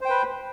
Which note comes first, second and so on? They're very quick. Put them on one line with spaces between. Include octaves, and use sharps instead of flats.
C5 G5 B4